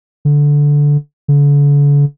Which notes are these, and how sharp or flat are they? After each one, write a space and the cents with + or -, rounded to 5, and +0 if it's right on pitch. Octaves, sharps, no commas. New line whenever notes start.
D3 -10
D3 -40